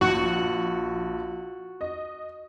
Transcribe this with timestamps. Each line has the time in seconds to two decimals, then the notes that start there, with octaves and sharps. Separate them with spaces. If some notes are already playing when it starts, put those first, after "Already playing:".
0.01 A#1 F#4
1.81 D#5